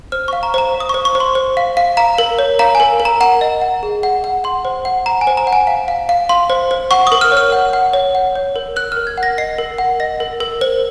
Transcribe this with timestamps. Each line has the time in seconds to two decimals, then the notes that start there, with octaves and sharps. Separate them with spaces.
0.12 C5 F6
0.28 F5 C#6
0.43 A#5
0.54 C5 A#5
0.74 F5
0.80 D#6
0.89 C5 C#6
1.05 C#6
1.15 C5
1.20 C6
1.35 C5
1.57 F5
1.77 F5
1.97 F5 A#5
2.18 A#4
2.39 C#5
2.59 F5 A#5
2.75 G#5
2.80 A#4
3.00 A#4
3.05 A#5
3.21 F#5 A#5
3.41 D#5
3.62 F#5
3.83 G#4
4.03 F#5
4.24 F#5
4.44 F#5 C6
4.65 C5
4.85 F#5
5.06 F#5 A#5
5.21 G#5
5.27 C5
5.37 A#5
5.47 F#5
5.53 G#5
5.67 F5
5.88 F5
6.09 F5
6.29 F5 C6
6.50 C5
6.71 C5
6.91 F#5 C#6
7.07 A#4 D#6
7.21 F6
7.32 C#5 F6
7.52 F#5
7.73 F#5
7.93 C#5
8.15 F#5
8.35 C#5
8.56 A#4
8.76 A#4 F#6
8.92 A#4 F6
9.07 G#6
9.18 F#5
9.23 A#6
9.38 D#5 C7
9.58 A#4
9.78 F#5
10.00 D#5 A#6
10.20 A#4
10.40 A#4
10.61 C5